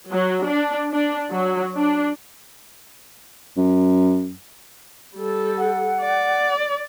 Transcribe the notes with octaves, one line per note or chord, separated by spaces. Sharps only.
F#3
D4
D4
F#3
D4
F#2
G3 A4
F#5
D5